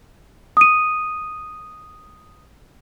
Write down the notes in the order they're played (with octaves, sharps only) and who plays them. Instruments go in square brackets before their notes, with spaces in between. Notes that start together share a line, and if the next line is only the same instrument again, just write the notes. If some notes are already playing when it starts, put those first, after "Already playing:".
[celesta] D#6 D#7